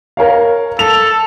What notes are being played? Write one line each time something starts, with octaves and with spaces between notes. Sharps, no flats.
A#4 C#5 F5
A4 F7